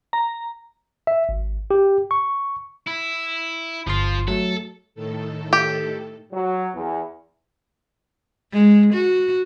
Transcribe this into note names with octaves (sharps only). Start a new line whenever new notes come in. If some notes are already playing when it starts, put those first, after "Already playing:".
A#5
E5
G#1
G4
C#6
E4
G1 F3 F4 C6
F#3 A3 A4
A2 D#3 A4
G4
F#3
E2
G#3
F#4